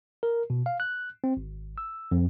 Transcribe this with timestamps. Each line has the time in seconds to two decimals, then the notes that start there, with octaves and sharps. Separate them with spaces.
0.23 A#4
0.50 B2
0.66 F5
0.80 F#6
1.24 C4
1.37 G#1
1.78 E6
2.12 F2